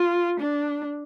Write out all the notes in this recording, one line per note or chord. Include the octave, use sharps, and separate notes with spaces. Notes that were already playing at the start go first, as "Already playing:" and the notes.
Already playing: F4
D4